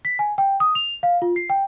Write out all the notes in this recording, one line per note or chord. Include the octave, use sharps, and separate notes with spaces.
B6
G#5
G5
D#6
F7
F5
F4
C7
G5